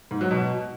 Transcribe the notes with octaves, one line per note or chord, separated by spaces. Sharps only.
G#2
F#3
B2